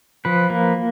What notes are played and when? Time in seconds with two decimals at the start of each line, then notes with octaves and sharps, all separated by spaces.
0.25 F3 B4
0.50 A#3